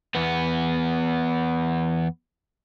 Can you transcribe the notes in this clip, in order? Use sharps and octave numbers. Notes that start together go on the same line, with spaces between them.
E2 B3